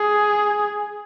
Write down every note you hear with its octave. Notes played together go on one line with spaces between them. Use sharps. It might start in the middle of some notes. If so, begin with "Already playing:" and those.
Already playing: G#4